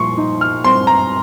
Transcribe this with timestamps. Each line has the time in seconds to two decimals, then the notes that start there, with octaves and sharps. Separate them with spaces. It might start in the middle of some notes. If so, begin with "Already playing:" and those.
Already playing: A#2 F3 C6 C#6
0.17 D#4
0.41 F6
0.64 C4 C6
0.87 A#5